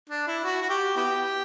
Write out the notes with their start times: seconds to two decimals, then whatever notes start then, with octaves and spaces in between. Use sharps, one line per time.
0.10 D4
0.27 E4
0.44 F#4
0.62 F#4
0.69 G4
0.97 B3 E4 G4